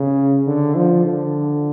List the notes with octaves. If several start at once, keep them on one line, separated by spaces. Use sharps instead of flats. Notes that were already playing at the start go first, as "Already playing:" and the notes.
Already playing: C#3
D3
F3
D3